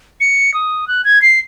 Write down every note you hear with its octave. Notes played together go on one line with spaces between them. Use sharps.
C#7
D#6
F#6
G#6
C7